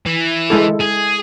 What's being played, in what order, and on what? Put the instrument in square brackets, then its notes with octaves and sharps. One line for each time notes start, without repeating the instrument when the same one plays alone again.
[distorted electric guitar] E3
[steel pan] G#3 E4 A4
[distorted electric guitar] G#4